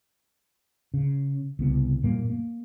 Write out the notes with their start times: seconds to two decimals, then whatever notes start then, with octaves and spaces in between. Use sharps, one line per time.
0.94 C#3
1.59 C2 C#3 B3
2.03 F#2 A#2 G3 A#3
2.30 A#3